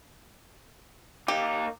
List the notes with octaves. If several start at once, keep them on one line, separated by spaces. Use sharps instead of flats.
A#3 D#4 G4